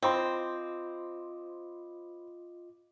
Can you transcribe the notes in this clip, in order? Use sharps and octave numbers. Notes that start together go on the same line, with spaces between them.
C4 F4 C5 D#5 B5 C6 D6